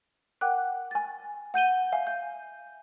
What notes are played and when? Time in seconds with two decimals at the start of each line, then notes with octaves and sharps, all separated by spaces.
0.41 A#4 F#5 G5 D6 F#6
0.91 G#5 A6
1.54 F#5 G6 D#7 G7
1.92 E5 F5 G#5
2.07 G6